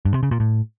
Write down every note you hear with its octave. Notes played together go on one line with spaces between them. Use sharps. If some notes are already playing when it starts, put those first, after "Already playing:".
G2
C3
C#3
A#2
A2